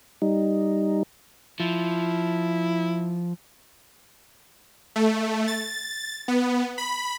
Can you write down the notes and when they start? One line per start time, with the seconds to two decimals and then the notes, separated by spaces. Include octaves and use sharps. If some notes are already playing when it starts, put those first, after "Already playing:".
0.22 G3 D#4
1.60 F3 E4
4.96 A3
5.48 A6
6.28 B3
6.78 B5